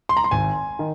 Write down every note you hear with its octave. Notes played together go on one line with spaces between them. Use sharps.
C6
A#5
C6
G#1 G#5
D#3